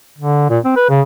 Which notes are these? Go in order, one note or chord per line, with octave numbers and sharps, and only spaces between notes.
D3
A#2
C4
B4
C#3